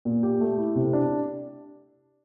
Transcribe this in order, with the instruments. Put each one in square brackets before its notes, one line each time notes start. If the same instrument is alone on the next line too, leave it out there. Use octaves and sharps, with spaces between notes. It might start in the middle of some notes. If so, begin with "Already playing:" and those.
[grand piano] A#2
G4
A3
E4
C3
D4